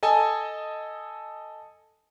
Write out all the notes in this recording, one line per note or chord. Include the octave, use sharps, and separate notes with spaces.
A4 D#5 G#5 A5